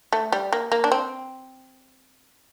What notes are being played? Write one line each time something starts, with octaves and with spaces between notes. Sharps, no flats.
A3
G3
A#3
A#3
D4
C4